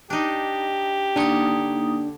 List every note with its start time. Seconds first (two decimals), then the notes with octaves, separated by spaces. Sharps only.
0.10 D4 D#4 G4
1.16 D3 A#3 D4 D#4 C#5 D#6